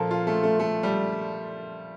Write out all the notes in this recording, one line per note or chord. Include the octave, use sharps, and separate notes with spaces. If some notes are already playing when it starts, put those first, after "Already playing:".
Already playing: A#2 F3 F4 A4 A#4
F4
A3
A3
A3
G3